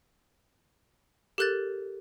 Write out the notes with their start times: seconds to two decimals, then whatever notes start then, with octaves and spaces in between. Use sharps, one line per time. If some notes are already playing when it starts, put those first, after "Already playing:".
1.38 G4 A4 A#4 F#6 G6 A6